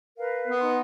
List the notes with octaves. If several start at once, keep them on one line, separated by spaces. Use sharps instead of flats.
A#4 B4 F5
B3
D#4 F#5 C6